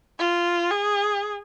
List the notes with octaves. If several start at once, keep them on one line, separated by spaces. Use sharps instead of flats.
F4
G#4